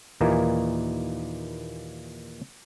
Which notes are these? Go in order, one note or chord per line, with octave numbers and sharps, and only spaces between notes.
D#2 A#2 E3 A#3 D#4 G#5